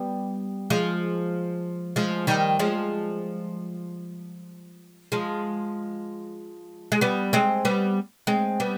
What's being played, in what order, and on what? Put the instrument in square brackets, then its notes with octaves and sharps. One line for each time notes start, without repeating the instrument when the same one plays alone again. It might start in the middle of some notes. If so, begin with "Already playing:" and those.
Already playing: [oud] G3 B3
F3 G#3
F3 G#3
D#3 G3
F3 G#3
F3 G#3
G#3
G3 B3
G#3 C4
G3 B3
G#3 C4
G3 B3